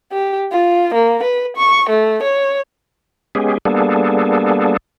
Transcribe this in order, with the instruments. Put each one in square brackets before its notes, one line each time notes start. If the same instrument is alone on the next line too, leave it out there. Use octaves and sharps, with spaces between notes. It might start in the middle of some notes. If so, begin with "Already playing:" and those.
[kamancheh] G4
F4
A#3
B4
C#6
A3
C#5
[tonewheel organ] G#3 B3 C#4 G4 G#4
G3 A#3 B3 D4 G#4 A4